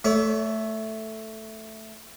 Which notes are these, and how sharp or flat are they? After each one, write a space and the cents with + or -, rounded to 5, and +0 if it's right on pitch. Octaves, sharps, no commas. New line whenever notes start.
A3 +0 C#5 +45